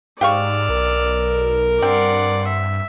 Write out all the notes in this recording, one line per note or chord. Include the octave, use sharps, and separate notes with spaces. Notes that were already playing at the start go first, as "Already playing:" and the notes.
G#2 G4 D5 F5 C#6 E6 F6
B1 A#4
G2 C4 D5 F#5 C6
E5